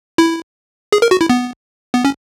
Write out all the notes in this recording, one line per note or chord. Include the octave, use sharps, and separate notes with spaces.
E4
G#4
A#4
F#4
E4
B3
B3
C#4